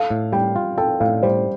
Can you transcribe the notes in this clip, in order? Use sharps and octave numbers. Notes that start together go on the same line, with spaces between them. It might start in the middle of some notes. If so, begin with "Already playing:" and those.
Already playing: A4 F5
A2
G3 G5
F4
A4 G5
A2 F5
G3 C5